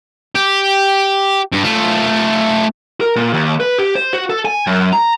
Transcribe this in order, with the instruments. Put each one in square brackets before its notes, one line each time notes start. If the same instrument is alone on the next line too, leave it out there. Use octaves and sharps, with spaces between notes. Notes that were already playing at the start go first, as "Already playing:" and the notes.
[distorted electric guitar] G4
G2
A3 F4
[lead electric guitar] A#4
A#2
D#2
B4
G4
C5
F#4
A4
G#5
F#2
A#5